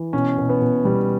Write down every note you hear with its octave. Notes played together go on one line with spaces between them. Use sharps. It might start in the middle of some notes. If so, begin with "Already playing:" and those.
Already playing: E3
B2 C#4
B2
B3
B2
B2 G3